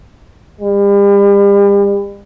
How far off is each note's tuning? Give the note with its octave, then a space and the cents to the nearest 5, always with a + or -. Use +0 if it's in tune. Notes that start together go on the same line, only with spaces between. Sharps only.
G3 +40